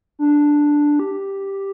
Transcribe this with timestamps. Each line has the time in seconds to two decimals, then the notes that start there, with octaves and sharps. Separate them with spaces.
0.19 D4
0.99 G4